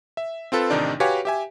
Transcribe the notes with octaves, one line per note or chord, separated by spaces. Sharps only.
E5
C4 F4 A4 B4
A1 C3 D#3 D4 D#4 D5
F#4 G4 B4 C#5 F5 G#5
G4 E5 G#5